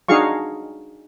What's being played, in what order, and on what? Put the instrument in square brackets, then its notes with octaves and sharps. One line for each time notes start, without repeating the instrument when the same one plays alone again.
[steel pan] D4 D#4 F#4 G#4 F5 C#6